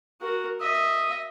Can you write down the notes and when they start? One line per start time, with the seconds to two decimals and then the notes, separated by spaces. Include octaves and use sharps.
0.21 F#4 A#4
0.61 D#5 E5